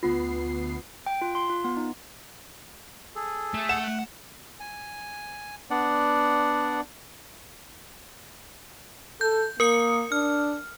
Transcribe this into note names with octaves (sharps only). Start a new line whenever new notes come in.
D2 B3 F4 C7
G5
F4
C6
F4
B3
D#4
G#4 A4
A3
F#5 E7
G#5
B3 D4 D5 F#5
A4 G6
A#3 A#4 D#6 C#7
D4 F6